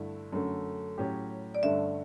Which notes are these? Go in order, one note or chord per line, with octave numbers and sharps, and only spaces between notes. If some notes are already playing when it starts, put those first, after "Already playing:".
Already playing: G2 D3 A3 E4 A4
F#2 D3 A3
A2 F#3 C#4 G4
D5
G2 D3 A3 C#4 E5